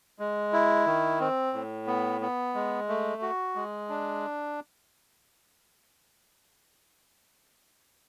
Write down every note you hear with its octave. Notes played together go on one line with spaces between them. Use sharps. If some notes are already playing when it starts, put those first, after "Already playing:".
G#3
E4
D#3
C4
A2
B3
B3
G#3
A3
F#4
G#3
D4